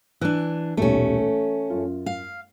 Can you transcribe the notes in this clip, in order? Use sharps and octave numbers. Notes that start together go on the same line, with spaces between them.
E3 D4 F#6
D#1 B1 G3 A3 C#4
A4
F#2 F4
F5